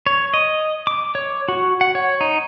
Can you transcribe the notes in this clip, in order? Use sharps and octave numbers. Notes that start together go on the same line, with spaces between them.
C#5
D#5
D6
C#5
F#4
F#5
C#5
D#4